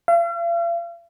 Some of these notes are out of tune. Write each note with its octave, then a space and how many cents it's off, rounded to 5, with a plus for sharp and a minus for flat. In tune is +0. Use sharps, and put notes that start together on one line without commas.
F5 -45